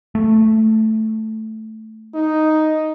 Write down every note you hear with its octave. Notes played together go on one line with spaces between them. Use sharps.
A3
D#4